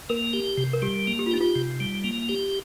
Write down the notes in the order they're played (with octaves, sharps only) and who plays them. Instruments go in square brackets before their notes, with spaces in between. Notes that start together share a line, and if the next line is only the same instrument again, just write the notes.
[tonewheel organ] A#3 [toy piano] A#4
[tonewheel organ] G4
C3
[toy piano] A#4
[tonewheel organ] G3 [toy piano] G4
[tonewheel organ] A#3
[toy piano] G4
F4
[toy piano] D#4 [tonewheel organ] G4
[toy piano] F4
[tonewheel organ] C3
G3
A#3
G4